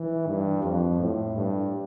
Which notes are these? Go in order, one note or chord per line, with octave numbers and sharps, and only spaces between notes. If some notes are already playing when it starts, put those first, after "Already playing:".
Already playing: E3
G2
F2
A2
G2